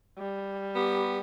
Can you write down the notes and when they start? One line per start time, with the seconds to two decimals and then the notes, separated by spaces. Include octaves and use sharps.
0.18 G3
0.75 B3 G4